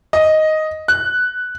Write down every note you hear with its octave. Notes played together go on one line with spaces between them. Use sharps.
D#5
F#6